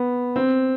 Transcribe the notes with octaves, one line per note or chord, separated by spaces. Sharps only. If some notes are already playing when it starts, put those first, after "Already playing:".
Already playing: B3
C4